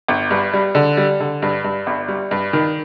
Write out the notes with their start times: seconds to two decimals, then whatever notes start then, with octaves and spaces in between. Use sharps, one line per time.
0.08 G1
0.31 G2
0.53 G3
0.75 D3
0.97 G3
1.20 D3
1.42 G2
1.64 G2
1.87 G1
2.08 G3
2.31 G2
2.53 D#3